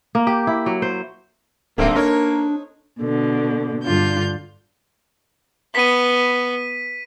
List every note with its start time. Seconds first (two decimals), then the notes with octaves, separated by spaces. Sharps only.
0.15 A#3
0.27 G4
0.47 E4
0.66 F#3
0.82 C5
1.78 D1 D3 G3 A3 A#3 C4 D#4
1.95 A#3 D4 D#4 A#4 C#5
3.01 B2 D3
3.84 G2 D3 D4 F4 G6
5.75 B3 B6 D#7